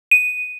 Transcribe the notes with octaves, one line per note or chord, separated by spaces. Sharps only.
D#7